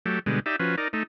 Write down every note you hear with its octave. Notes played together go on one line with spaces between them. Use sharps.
F#3 A3 G4
B2 D3 G3 G#3
D#4 G4 D5 E5
F3 C#4 F#4 B4
D#4 A#4 D5
A3 D#4